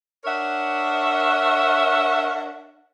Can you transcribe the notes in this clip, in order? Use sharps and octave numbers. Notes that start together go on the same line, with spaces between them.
D4 A#4 C#5 E5 F#5